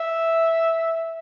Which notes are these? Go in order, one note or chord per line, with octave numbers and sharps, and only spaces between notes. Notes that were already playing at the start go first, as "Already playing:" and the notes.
Already playing: E5